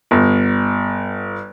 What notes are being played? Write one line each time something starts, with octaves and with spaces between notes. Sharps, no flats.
G1